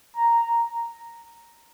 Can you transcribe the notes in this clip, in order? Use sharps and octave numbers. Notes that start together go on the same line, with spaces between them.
A#5